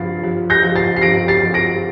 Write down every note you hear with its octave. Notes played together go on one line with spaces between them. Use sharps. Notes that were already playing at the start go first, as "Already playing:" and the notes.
Already playing: G2 F3 A6 C7
F3
G6 A#6
F3
A6 C7
C7
F3 A#6 D7
A6 C7
F3
A#6 D7